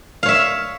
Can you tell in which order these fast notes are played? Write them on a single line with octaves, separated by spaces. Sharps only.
F5 C#5 E5